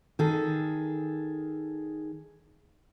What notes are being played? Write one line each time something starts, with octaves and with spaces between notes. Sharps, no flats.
D#3 G#4 A4